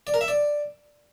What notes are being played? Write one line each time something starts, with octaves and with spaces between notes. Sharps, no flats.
D5
A#4
E5
D5